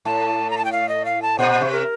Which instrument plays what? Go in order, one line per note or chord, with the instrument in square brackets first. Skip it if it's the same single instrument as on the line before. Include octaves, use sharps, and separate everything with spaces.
[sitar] A2 [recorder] A5
[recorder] A#5
A5
G5
F5
D#5
F5
A5
[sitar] A#2 [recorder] C5
[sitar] C3
[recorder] A#4